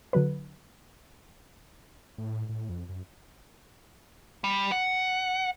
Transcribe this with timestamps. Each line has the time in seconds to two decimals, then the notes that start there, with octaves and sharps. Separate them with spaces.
0.13 D3 F#3 B4
2.18 A2
2.49 A2
2.69 F2
2.89 F#2
4.44 G3
4.72 F#5